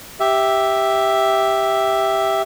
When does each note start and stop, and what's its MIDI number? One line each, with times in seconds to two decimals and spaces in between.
0.20 2.42 67
0.20 2.42 76